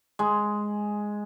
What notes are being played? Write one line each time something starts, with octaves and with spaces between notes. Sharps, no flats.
G#3